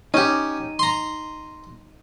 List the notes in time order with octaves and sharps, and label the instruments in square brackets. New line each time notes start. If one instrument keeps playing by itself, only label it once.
[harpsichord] C#4 G4 [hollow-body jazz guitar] D#4
[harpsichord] A#5 C6